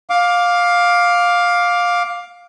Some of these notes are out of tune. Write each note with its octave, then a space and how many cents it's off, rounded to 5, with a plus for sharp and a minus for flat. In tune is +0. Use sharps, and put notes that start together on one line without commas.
F5 +15 D6 -5